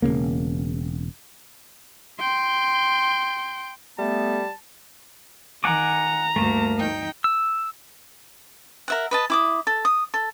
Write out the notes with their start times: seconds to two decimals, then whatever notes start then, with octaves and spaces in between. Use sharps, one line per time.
0.02 E1 F2 C#3 A#3
2.20 G5 C6
3.99 G3 A3 B3 A5
5.64 D#3 F#5 G#5 A#5 D6
6.36 D2 G2 A3 A#3
6.77 D#4 G5
7.24 E6
8.88 A#4 E5 F#5
9.11 B4 D#5 A5
9.30 E4 D6 D#6
9.67 A4
9.85 D#6
10.14 A4